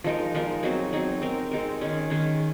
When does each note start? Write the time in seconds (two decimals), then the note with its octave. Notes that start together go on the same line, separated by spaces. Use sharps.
0.04 F3 G#3 D#4 A#4
0.35 F3 G#3 D#4 A#4
0.63 F#3 C4 D#4 G#4
0.93 F#3 C4 D#4 G#4
1.22 G#3 C4 D#4 A#4
1.51 G#3 C4 D#4 A#4
1.81 D#3 G#3 C#4 G#4
2.10 D#3 G#3 C#4 G#4